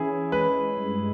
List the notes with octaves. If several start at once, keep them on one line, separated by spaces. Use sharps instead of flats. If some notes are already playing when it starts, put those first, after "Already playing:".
Already playing: E3 C#4 E4 G#4
G#3 B4
G2